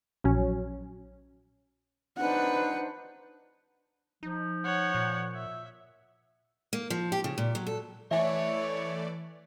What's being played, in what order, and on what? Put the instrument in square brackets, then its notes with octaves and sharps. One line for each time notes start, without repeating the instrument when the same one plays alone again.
[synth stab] A#1 F#3 C#4
[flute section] D4 D#4 C5 [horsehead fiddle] B4 F#5
[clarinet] F3 [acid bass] D#4
[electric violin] C#5 F#5
[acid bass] A#2
[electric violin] E5
[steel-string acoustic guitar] A#3
F3
G4
C#3
A#2
F#3
A4
[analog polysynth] E3 A3 D5 [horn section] C#5 [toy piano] E5 G#5